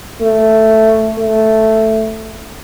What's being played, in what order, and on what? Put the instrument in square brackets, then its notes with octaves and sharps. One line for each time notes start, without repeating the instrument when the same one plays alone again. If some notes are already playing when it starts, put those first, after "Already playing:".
[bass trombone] A3
A3